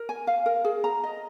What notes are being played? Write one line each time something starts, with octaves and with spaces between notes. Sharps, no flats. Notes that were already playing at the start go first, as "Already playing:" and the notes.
Already playing: A#4
G#5
F5
A#4
G#4
A#5
D#5